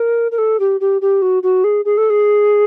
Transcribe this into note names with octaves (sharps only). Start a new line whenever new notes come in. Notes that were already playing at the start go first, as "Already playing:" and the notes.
Already playing: A#4
A#4
A4
G4
G4
G4
F#4
F#4
G#4
G#4
A4
G#4